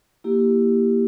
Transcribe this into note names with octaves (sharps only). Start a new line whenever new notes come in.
A#3 E4 G4